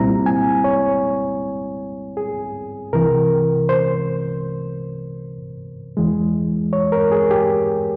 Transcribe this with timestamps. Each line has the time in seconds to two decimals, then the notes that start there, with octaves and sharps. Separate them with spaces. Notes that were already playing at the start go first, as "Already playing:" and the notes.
Already playing: C2 A#2 G3 C4 E4 A#5
0.26 G#5
0.64 C#5
2.17 G#4
2.93 C2 C3 E3 A#4
3.69 C5
5.97 E2 E3 G#3
6.73 C#5
6.92 A#4
7.12 G#4
7.31 G4